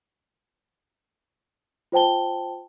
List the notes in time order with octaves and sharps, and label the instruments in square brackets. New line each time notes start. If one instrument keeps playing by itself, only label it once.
[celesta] F4 C5 G5 A5 G7